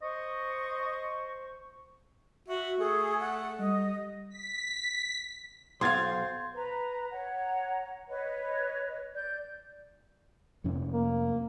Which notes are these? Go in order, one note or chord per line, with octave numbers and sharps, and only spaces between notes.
C5 D#5 C#6
F#4 E5
A3 G#4
F#5
G3 D#5
B6
B1 C5 F5 C6 G#6 A6
B4 A#5
C#5 F#5 A#5
B4 C#5 D#5
D5 G6
F2 C3 C#4
A#3